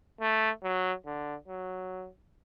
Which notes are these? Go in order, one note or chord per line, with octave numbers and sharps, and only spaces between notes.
A3
F#3
D3
F#3